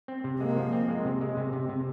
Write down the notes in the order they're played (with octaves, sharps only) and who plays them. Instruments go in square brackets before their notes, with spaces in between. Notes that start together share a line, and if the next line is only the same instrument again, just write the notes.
[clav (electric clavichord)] C4
C3
[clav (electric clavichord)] G#3 [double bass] A#3
[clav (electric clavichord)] F3
C4
G#3
C3
G#3
C3
C3
C3